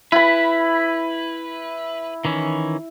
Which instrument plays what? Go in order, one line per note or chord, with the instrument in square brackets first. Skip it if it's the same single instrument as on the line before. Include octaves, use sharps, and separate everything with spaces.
[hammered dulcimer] E4 B5 [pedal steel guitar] B4
[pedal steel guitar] D#3 E3 C#4